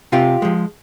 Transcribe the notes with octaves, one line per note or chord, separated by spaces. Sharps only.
C3 F4 G4
F3 G#3